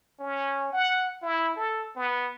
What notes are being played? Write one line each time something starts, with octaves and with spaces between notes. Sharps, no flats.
C#4
F#5
E4
A4
B3